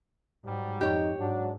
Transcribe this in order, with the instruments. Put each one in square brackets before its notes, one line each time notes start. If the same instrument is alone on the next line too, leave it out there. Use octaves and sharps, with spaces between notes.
[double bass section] G#2 [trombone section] F#3 G3
[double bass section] F2 [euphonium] D#4 [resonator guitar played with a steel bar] G4 C#5
[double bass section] G#2 [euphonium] F#3 [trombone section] D4